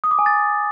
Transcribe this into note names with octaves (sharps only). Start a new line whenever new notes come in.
D#6
D6
G#5
A6